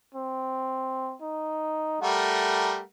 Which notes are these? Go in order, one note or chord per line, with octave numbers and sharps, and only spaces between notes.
C4
D#4
G3 A3 A#4 F#5